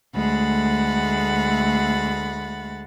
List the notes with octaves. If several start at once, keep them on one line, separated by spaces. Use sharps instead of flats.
D2 G#3 A3 F#5 B5 A6